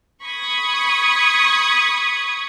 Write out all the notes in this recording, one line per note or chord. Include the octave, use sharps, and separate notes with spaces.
B5 C#6 D#6 G#6